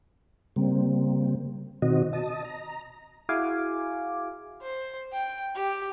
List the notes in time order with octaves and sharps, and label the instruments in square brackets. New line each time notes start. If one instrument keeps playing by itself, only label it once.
[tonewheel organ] C#3 G3 A#3 C4
B2 D#3 C4 F#4 D#5
D#5 A5 D#6
A#5
[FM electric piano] E4 F#4 G#4 F5 G#5 D6
[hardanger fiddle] C5
G5
G4